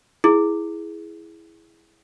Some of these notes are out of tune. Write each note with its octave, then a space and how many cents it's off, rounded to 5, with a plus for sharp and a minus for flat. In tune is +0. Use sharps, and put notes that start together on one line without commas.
E4 +0 G#4 +5